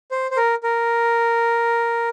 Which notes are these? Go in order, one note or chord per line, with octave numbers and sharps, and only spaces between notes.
C5
C5
A#4
A#4